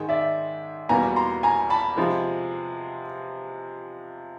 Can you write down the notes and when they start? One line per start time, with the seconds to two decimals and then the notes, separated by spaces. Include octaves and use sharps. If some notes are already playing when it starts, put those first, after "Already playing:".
Already playing: G#2 D#3 G#3
0.09 D5 E5
0.89 E2 B2 G3 A#3 G#5 A#5
1.16 A#5 C6
1.43 G#5 A#5
1.70 A5 B5
1.97 C3 F3 G#3